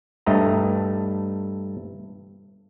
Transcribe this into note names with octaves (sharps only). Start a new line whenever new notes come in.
G2 A3 D#5 A#5